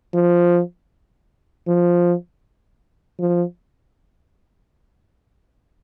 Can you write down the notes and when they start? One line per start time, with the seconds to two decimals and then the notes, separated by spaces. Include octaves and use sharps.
0.14 F3
1.68 F3
3.20 F3